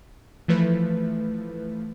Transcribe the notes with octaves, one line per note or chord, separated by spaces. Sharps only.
E3 F3 A3 E4 B4